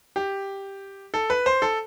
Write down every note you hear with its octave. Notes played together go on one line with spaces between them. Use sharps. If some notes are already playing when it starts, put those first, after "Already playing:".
G4
A4
B4
C5
A4